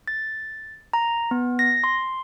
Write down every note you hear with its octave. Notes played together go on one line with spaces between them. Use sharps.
A6
A#5
B3
A#6
C6